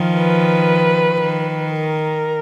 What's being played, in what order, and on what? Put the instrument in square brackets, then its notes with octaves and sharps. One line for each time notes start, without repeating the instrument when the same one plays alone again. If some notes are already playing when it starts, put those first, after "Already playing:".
Already playing: [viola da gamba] D#3 F3
[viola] B4
[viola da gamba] D#3
[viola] A#4